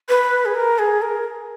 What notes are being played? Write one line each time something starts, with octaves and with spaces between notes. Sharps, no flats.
B4
G#4
A#4
G#4
A#4